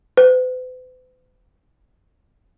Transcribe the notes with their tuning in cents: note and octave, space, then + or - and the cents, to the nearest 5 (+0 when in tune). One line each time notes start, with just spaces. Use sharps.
B4 +45